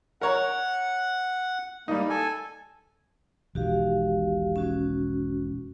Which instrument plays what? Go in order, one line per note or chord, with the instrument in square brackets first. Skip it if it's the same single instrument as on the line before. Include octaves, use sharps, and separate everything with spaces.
[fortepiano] A#4 C#5 A#5 [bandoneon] F#5
[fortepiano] G3 D#4 [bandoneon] A#3
[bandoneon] A4 G#5
[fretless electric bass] E1 B1 D#3 [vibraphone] F#4 G4 F5
[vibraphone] C#4 F#4